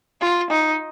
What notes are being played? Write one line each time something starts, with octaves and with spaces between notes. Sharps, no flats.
F4
D#4